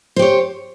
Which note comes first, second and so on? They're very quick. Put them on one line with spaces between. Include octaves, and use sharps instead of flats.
C5 G4 C#5